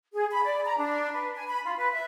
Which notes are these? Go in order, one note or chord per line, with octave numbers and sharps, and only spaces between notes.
G#4
B5
D5
A#5
D4
B4
G#5
B5
F4
B4
E5